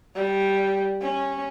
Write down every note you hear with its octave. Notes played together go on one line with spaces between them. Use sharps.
G3
C#4